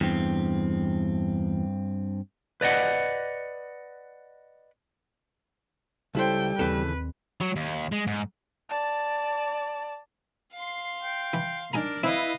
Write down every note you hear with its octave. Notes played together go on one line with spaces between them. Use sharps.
E2 G2 C4
B4 D5 D#5 F#5
C#2 G3 E4 A4 C5 G5
D#2 C#3 E3 C4 A4 B4
F#3
D#2
G#3
G#2
D5 A5
F5 C6
G5
E3
D4 D#4 A#4 G#5 A#5
C4 E4 B4 D#5 F5